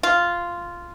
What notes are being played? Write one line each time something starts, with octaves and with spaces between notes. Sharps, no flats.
F4